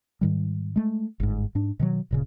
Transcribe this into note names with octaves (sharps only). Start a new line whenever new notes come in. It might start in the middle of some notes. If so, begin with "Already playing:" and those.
G#2 D#3 G3
G#3 A3
G1 G#2
G#2 D4
B2 D#3 F#3
D1 A#2 C#3